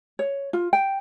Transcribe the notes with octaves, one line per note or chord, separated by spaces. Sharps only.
C#5
F4
G5